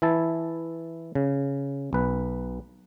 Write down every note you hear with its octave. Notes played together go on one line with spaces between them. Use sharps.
E3 E4 A5
C#3
B1 B4